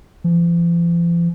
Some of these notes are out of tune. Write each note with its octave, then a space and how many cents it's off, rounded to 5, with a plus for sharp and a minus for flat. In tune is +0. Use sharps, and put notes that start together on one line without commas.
F3 -45